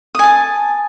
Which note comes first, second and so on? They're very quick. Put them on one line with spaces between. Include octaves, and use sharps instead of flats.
D#6 G#5 A5